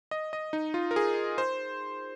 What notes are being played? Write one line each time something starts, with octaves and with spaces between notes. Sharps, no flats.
D#5
D#5
D#4
F4
A#4
G#4
C5